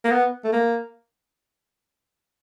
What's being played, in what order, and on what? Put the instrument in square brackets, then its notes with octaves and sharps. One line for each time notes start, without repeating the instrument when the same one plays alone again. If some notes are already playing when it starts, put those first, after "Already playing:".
[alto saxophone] A#3
B3
A3
A#3